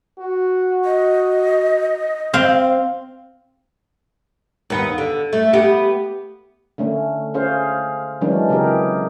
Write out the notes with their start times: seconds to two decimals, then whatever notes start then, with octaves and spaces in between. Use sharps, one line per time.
0.20 F#4
0.85 D#5
2.34 C4 C5 F5
4.70 D#2 B3
4.98 D3
5.33 A3
5.53 B3 G4
6.78 D3 A3 C#4
7.34 C#4 G#4 C5 F5
8.21 D#3 E3 F#3 G#3 C#4 D4
8.49 C#3 E3 C4 G4 G#4 A#4